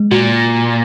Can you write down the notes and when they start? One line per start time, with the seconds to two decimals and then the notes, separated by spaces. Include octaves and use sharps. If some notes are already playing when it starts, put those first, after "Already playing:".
Already playing: G#3
0.11 A#2 F#4